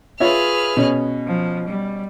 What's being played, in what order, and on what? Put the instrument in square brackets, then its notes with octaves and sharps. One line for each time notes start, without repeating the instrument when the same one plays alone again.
[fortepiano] F4 C#5 E5 [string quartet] G#4 B4 F6
[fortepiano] B2 C#4
[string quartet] F3
G3